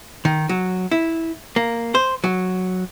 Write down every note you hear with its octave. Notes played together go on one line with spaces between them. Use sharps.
D#3
F#3
E4
A#3
C5
F#3